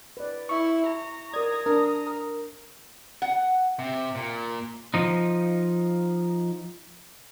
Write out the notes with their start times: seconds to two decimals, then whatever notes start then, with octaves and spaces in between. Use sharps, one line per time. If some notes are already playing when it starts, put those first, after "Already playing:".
0.17 B4 D5
0.49 E4 C#6
0.87 A#5
1.34 A#4 D5 D#6 G#6
1.66 D4 A#4
2.07 A#4
3.22 F#5
3.79 C3
4.15 A#2
4.94 F3 D#4